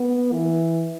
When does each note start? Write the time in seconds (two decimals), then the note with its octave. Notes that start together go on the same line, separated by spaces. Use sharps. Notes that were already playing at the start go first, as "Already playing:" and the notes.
Already playing: B3
0.32 E3